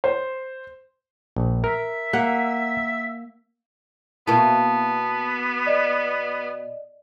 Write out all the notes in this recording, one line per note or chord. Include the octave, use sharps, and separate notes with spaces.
C5
A#1
A#4 E5
A#3 F#5
B2 A#3 B3 E4 A5
D5 D#5